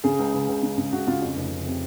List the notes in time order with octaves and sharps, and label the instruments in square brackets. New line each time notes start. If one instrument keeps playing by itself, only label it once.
[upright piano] C#3 G#4
C#2
C#2
C#2
C#3
C#3
C#3 F#4
C#3 F4
F2 C#4
F1
F1
C3